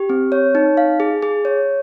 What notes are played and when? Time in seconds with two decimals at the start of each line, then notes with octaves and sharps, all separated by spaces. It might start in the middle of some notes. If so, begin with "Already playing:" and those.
Already playing: G4
0.09 C4
0.32 C#5
0.55 D#4
0.77 F5
1.00 G#4
1.22 G#4
1.45 C#5